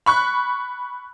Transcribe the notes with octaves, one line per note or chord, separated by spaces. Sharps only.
B5 C#6 F#6